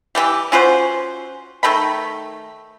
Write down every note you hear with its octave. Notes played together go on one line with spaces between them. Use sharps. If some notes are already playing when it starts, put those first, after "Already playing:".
E3 G3 G4
C#4 F4 F#4 C5
D#3 A3 G5 B5